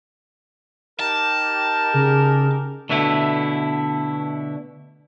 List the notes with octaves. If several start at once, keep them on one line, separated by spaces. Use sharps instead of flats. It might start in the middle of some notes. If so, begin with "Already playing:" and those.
D#4 G4 A#4 A5
C#3 G#4
B2 D3 A3 E4